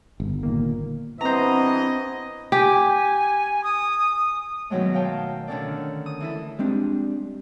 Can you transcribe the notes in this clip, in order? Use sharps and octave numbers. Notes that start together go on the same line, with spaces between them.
G1
A#2 D#3 A#3
G2 E3 B3 C4 C5 D#5 A#5
G4 G#5
D#6
G#2 B2 D#3 F#3 G#3 A3
C#5 F5 G5 A5
D3 D#3 C#4 D4 A4 D5
D#6
E3 E4 A4
G3 G#3 C4 D4